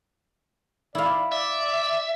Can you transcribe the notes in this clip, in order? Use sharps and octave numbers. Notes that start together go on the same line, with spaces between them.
E4 D5 F5
D5 E5